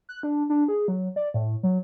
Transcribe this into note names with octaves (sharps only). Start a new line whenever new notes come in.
F#6
D4
D4
G#4
F#3
D5
A2
F#3